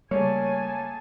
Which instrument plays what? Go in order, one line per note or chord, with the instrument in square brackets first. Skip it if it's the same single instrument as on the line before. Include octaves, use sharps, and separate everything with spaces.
[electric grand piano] C#3 A3 A#3 [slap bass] G3 [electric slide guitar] C#5 [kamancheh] G#5 A5